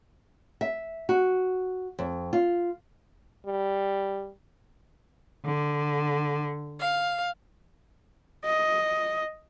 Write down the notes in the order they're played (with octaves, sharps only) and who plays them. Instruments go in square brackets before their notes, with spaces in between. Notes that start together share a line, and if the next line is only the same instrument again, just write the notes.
[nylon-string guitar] E5
F#4
F2
F4
[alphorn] G3
[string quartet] D3
F5
[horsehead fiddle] D#5